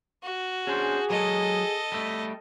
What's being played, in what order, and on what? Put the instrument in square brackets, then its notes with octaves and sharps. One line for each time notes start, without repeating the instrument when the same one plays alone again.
[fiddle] F#4
[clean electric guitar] C#4 D4 C5 [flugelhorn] G#4
[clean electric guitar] F#3 G#3 [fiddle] A4 D#5
[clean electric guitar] G3 A3